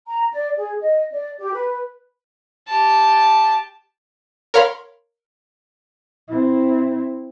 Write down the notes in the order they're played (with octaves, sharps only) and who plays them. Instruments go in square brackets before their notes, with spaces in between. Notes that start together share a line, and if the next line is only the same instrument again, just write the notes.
[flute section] A#5
D5
G#4
D#5
D5
G4
B4
[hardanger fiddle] G4 A5
[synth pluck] A#4 C#5 F5 B5 C6
[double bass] C4 E4